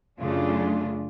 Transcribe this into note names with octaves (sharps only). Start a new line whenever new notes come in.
F#2 C#3 A3 D4 F4